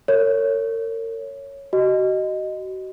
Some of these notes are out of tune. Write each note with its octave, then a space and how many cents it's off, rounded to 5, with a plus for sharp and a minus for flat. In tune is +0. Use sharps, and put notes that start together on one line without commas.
A#4 -40 C#5 +0
F#4 +35 D#5 -10